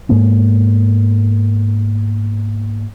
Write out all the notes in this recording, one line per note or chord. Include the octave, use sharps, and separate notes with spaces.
G#2 G#3 A#3 B3